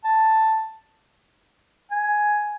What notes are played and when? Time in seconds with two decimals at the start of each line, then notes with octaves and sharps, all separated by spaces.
0.04 A5
1.91 G#5